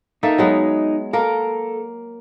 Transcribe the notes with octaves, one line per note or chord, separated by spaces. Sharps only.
A#3 D#4 A4 E5
F#3 G#3 B3
A#3 A4 A#4